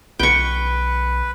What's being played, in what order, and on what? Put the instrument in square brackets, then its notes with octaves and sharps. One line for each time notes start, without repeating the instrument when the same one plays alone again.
[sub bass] B1 [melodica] B4 [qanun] G5 C#6